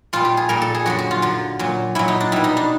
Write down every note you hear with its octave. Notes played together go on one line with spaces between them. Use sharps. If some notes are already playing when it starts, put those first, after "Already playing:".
A#2 G3 F4
G4
G#4
A#2 G3 A#4
A4
G#4
F#2 D3 F#3 F#4
F#4
F4
F#2 D3 F#3
A#2 F#3
A#2 F#3 E4
D#4
D4
B2 G3 E4
D#4
D4